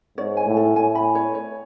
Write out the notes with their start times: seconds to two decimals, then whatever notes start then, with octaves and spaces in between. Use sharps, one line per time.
0.18 G#2 C#5
0.37 G#5
0.46 A2
0.57 A4
0.76 A2 G#5
0.95 B5
1.15 C#5
1.35 C#5